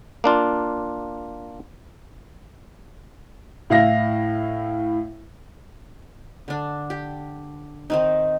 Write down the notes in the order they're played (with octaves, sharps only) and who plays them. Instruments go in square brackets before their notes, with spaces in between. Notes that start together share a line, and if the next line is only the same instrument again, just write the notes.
[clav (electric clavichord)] A#3 D4 F4
[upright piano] A2 E4 F5 A#6
[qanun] D3 D4
G4
D#3 C4 D#4